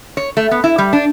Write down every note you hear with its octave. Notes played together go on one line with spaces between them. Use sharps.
C#5
A3
B3
E4
G3
D4